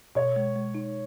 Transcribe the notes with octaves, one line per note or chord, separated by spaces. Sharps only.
B2 C#5
G#3
G#3
D#4